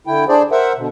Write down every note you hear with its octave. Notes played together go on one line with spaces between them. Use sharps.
D3 E4 G5
D4 G#4 C5 D5
A#4 C5 E5 F#5
B2 D3